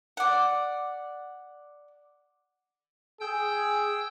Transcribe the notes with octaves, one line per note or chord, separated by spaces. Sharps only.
D5 F#5
G#4 G5 E6 G6